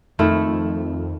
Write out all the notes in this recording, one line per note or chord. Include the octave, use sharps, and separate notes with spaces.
F2 D#3 A3 E4